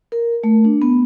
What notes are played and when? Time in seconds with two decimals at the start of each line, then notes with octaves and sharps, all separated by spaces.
0.12 A#4
0.44 A3
0.65 D4
0.82 B3